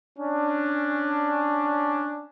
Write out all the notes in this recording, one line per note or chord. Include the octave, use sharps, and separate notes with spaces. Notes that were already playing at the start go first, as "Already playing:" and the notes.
C#4 D4